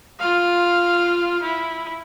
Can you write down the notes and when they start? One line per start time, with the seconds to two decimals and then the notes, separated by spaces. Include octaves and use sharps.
0.19 F4 F5
1.43 E4